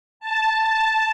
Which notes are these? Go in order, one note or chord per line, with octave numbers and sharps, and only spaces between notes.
A5